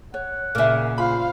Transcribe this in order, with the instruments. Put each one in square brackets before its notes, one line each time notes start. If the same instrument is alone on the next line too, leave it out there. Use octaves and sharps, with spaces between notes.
[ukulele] C#5 [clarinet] F#5
[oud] A#2 C#3 [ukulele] A#4 E5
[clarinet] F4 [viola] C5 F5 [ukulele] B5